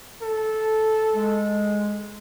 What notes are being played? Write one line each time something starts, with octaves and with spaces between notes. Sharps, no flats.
A4
G#3